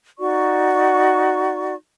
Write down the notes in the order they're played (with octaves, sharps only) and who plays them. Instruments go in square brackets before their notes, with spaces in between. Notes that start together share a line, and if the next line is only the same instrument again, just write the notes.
[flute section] D#4 F#4 D5 C#6